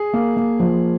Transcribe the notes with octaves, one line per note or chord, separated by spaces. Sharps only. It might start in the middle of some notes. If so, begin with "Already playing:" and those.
Already playing: G#4
A#3
A#3
F3